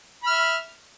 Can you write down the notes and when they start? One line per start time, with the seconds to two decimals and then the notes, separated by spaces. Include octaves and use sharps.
0.24 B5
0.27 F6
0.30 E5